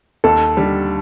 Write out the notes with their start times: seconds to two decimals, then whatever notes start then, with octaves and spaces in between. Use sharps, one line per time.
0.24 D#2 A4
0.57 D3 G3